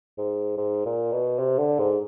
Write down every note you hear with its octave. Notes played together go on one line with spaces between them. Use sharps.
G#2
G#2
A#2
B2
C3
D3
G#2